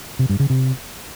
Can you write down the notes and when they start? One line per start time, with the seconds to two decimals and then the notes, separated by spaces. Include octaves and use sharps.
0.19 C3
0.29 G2
0.40 C#3
0.50 C3